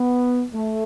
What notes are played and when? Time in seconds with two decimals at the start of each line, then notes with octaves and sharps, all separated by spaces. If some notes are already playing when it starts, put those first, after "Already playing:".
Already playing: B3
0.53 A3